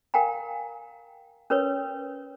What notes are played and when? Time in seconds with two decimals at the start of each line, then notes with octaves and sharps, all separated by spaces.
0.14 A#4 F5 G5 G#5 A#5
1.50 C#4 A#4 B4 C#5